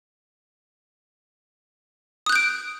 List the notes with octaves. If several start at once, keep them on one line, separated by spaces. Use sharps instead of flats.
D#6 F#6 G6 D7